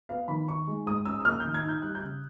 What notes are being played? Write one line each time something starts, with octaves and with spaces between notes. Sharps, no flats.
B3 F5
D#3 B5
D#4 C#6
G#3
G#2 D#6
C#4 E6
E6
A#3 F6
D#3 G6
G#6
D#4 G6
G3 F#6
G6
C#3